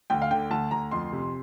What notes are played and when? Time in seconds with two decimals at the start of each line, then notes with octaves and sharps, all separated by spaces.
0.10 D2 G5
0.22 F5
0.31 D3 G5
0.51 D2 A5
0.71 D2 A#5
0.91 F2 C6
1.12 C3